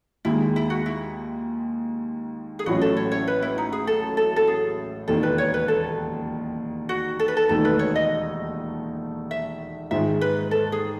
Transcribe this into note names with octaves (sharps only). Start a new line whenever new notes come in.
D#2 D#3 G#3 E4
E4
F#4
E4
G#4
A1 A2 F#3 C#4 F#4
A4
C#5
C#5
B4
E4
D#4
G#4
A4
A4
A4
G#4
E1 D#2 D#3 A4
B4
C#5
B4
A4
F#4
A4
B4
A4
E1 D#2 D#3 A3 D#4 A4
B4
C#5
D#5
E5
G#2 D#3 G#3 E5
B4
A4
G#4